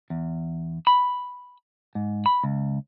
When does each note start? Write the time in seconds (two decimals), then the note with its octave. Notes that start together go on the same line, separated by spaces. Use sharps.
0.10 E2
0.87 B5
1.95 G#2
2.26 B5
2.44 C#2